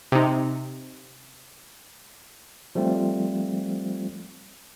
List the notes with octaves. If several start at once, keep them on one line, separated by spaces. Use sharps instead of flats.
C3 D#4
F3 G3 A3 C4 F4